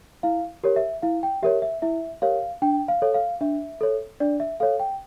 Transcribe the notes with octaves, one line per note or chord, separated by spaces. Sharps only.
E4 F5
G4 A#4 C#5
E5
E4 F5
G5
G4 A#4 C#5 E5
E5
E4 E5
G4 A#4 C#5 F5
D4 G5
F5
A4 C#5
F5
D4 E5
A4 C#5
D4 D5
E5
A4 C#5 F5
G5